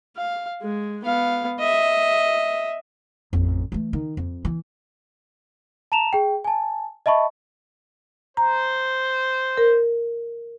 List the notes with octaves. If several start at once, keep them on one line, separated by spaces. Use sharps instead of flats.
F5
G#3
B3 F5
D#5 E5
A1 F2
E3 A3
D#3
F2
E3
A5 A#5 E7 F7
G#4 G5
G#5 A5
D#5 E5 A5 B5 C#6
C5 A#5
A#4